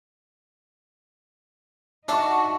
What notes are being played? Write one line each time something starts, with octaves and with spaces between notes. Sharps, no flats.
D4 D#4 F#4 E5 A5 C#6